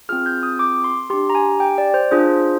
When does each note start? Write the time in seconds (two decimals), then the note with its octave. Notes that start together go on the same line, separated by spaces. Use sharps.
0.09 C4 F4 G#4 F6
0.26 G6
0.43 D#6
0.59 D6
0.84 C6
1.10 D4 G4 C6
1.30 A#5
1.35 G#5
1.60 G5
1.78 D5
1.94 C5
2.11 D4 F4 G#4 C5